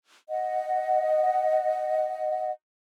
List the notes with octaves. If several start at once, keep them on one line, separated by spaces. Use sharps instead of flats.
D#5 F#5